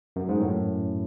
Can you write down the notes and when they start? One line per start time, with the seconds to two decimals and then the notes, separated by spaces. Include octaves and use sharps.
0.16 F#2
0.29 G#2
0.40 F#2 A2